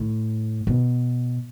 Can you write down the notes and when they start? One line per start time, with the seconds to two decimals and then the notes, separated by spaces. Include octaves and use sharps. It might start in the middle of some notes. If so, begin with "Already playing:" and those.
Already playing: A2
0.67 B2